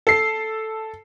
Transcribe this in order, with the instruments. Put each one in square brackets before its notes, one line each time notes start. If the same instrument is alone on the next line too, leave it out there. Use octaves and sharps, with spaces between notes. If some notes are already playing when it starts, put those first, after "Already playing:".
[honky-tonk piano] A4 C7